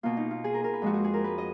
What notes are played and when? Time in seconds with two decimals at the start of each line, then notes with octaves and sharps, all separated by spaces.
0.03 B2 A#3 F4
0.17 D#4
0.31 F4
0.44 G#4
0.54 A#4
0.64 A#4
0.74 B4
0.82 F2 F3 G#3 F#4
0.94 F#4
1.04 G#4
1.14 A#4
1.24 B4
1.38 D#5